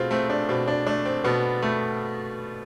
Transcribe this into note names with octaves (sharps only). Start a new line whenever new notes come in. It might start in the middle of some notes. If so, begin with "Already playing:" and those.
Already playing: B2 A3 C4 F4 G#4
A3 C4
D4
B2 C4
D4
A3 D4
C4
B2 B3
A3